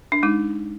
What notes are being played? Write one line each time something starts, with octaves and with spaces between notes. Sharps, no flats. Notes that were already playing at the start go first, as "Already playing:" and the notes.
D4
G#3 D#4